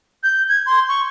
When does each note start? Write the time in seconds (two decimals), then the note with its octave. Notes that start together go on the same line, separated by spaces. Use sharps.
0.23 G6
0.49 G#6
0.66 C6
0.89 C#6